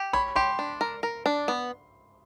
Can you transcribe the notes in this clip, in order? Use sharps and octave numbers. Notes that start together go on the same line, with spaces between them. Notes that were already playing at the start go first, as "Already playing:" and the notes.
Already playing: G4
C#5 B5
G4 C6
D4
A#4
A#4
D4
B3